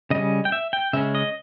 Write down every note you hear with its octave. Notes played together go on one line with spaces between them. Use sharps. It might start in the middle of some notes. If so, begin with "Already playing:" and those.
C#3 G3 C#4 D#5
G5
E5
G5
C#3 G#3 C#4 E5
D#5